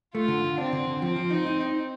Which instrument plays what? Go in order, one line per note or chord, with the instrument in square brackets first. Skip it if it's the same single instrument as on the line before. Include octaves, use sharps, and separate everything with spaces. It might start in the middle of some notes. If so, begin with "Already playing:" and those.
[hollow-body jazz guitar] A3 [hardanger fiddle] F4
[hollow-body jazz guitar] D3
D3
[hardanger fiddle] C4 [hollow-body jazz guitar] D4
[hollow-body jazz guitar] D3
D3
[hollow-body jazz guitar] F3 [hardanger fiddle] C4
[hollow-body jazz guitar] F3
D#4
D#4
D#4